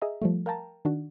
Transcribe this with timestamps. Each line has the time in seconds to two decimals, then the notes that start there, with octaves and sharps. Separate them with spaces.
0.02 G#4 D#5 E5 A#5
0.22 F3 G3 A3
0.46 A#4 F5 G5 A5 A#5
0.85 D#3 D4 F#4